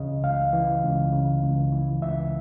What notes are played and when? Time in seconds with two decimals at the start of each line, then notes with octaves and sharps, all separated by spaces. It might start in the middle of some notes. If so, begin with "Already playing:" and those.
Already playing: C#2 C#3 E3 D#5
0.23 C#2 F5
0.53 E3
0.83 C#2
1.12 C#3
1.43 C#2
1.72 E3
2.02 C#2 E5